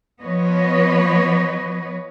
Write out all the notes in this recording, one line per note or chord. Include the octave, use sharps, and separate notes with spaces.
F3 B3 B4 C#5 D#5